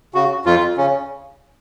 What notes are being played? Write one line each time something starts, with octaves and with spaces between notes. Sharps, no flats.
C#3 F#4
F2 F4
C#3 C#4